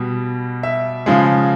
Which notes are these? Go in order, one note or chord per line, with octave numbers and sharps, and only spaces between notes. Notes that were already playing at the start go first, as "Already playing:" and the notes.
Already playing: B2 G3
E5
C#3 F3 G#3